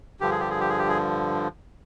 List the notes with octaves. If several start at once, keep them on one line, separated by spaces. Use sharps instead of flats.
G2 D3 F3 G4
G#4
G4
G#4
G4
G#4
G4
G#4